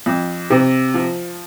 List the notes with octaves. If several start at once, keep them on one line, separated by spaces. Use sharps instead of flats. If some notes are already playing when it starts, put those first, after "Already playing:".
F2
C3
F3